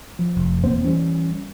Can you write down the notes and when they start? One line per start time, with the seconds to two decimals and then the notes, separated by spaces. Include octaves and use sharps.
0.19 F3
0.37 F1
0.64 E1 A#3 C4 C5
0.85 E3 G3 C#4